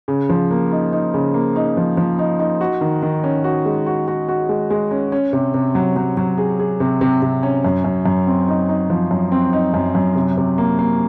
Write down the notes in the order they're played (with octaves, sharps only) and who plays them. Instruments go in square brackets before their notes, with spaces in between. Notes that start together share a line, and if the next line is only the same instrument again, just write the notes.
[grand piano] C#3
F3
A#3
D#4
D#4
C#3
A#3
D#4
F3
F3
D#4
D#4
F#4
D#3
D#3
C#4
F#4
G#3
F#4
F#4
F#4
G#3
G#3
C#4
C#4
C3
C3
F#3
F#3
F#3
G#4
G#4
C3
C3
C3
C#4
F#2
F#2
F#2
C4
D#4
D#4
F3
F#2
C4
D#4
F#2
F#2
C3
C3
A#3
A#3